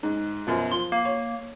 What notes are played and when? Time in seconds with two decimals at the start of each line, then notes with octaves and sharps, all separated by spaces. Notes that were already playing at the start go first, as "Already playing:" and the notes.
0.03 G#2
0.47 F#2 B2 F3
0.72 F3 C6
0.92 A#3
1.05 C#5